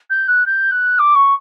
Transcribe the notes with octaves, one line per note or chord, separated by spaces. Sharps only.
G6
F#6
G6
F#6
D6
C#6